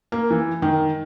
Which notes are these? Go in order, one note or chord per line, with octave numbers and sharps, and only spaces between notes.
A#3
E3
D#3